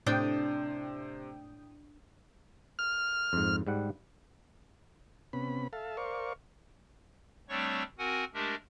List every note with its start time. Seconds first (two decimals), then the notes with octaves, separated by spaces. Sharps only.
0.06 A2 C3 D4 C5 G5 D#6 G6
2.79 F6
3.33 F2 G#2
3.67 G#2 G3 F#5
5.33 C3 B3 C#4 B5
5.73 A4 E5 F5 A5
5.97 A#4 C5 D5 F5 C#6
7.49 G3 A3 C4 D4 C#5 C#6
7.98 C4 F#4 A#4 F#5 G#5
8.34 G#3 A3 D4 G4 A#4